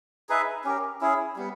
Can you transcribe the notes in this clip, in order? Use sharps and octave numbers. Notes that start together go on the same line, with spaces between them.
D#4 G#4 B4 E5
C#4 G4 A#4
C#4 E4 G#4
G3 B3